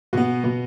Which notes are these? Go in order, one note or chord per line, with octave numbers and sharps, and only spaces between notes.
B2 B3 F#4
B2 B3